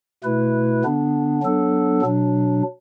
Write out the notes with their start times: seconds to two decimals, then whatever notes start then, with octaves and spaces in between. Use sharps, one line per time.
0.24 B2 A3 E4 B4
0.84 D3 B3 D4
1.43 F#3 B3 D4 A4
2.02 B2 F#3 D4